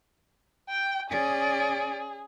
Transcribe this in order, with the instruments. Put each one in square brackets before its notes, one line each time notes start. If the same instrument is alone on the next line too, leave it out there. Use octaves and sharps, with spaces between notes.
[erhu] G5
[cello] C#4 D5 [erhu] G#4